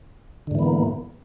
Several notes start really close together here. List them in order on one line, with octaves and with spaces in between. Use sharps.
D3 G#2 E3 B3 A#3